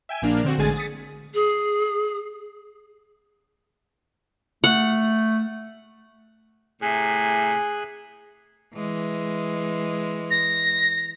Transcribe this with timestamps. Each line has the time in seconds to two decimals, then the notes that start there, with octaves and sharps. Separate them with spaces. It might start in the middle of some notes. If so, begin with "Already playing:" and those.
0.09 E5 G5 G#5
0.22 A#1 A#3 D4 F6
0.44 D3 C4 F#4
0.58 A1 D3 G#3 G#4 G#5 A6
0.76 D#6 A6 B6 C#7
1.34 G#4
4.64 A3 F#5
6.82 A2 C3 G#4 G#5 F#6
8.74 E3 G#3
10.31 A#6